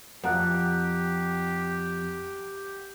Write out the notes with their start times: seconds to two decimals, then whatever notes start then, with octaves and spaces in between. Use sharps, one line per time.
0.24 F2 G4 F#5 A#5 F#6